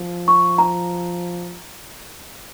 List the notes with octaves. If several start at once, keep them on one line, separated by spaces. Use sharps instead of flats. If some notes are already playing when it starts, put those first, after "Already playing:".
Already playing: F3
C#6
A#5